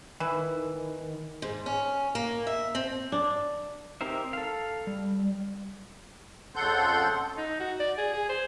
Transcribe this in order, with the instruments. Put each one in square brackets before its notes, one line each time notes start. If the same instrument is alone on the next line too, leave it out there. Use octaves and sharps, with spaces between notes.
[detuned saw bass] D#3 [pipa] E3
[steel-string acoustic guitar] G#2
C#4
A#3
E5
C4
[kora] D4
[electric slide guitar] C4 D#4 G4 A#4 C5 E5
A4 F5
G3
[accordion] F2 C#3 A4 F#5 C6 G6
[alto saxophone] D#4
F#4
D5
G#4
G#4
C5